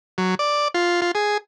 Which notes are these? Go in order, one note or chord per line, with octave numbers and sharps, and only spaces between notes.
F#3
D5
F4
F4
G#4